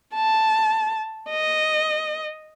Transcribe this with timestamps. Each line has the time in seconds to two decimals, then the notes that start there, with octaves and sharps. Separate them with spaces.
0.15 A5
1.30 D#5